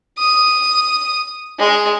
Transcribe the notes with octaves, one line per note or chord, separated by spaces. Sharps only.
D#6
G#3